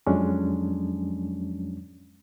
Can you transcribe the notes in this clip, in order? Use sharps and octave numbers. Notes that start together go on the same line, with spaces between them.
F2 F3 F#3 G#3 C#4 D4